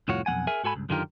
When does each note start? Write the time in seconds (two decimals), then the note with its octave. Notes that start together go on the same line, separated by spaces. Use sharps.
0.08 C2 F2 A2 F4 F#4 C#5
0.26 B1 F2 G#3 F#5 G#5
0.47 G#4 A#4 E5 G#5
0.64 G#2 F#4 A4 G#5 B5
0.76 C#2 G2
0.89 F#2 D3 D#3 F4 G4 A#4